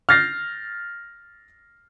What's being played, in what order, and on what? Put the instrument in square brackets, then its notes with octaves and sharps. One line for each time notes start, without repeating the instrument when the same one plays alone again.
[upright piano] F6 G6 A6 A#6 C7